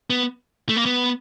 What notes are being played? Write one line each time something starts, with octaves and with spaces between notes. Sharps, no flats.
B3
A3
A#3
B3